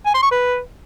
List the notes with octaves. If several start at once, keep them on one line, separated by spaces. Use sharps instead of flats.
G#5
C6
C#6
B4